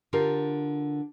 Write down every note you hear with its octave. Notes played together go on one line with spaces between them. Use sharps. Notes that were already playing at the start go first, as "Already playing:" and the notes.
D3 F4 G4 A#4